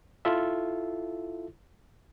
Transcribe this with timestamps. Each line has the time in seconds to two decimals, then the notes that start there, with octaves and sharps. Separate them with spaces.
0.25 E4 F4 A4 E5